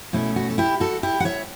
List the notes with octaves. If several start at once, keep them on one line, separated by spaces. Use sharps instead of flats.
B2 A3 C#4 E4
F#4
A4
E4 G4
F#4 A4
E4 G4
F#5
C#5 E5